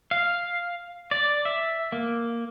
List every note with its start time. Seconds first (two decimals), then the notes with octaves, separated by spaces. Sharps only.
0.11 F5
1.11 D5
1.45 E5
1.92 A#3